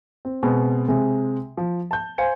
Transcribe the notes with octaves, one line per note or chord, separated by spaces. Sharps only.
C4
B2 G#3 C4
C3 G#3 C4
F3
A5 G6
C5 F5 G#5 C#7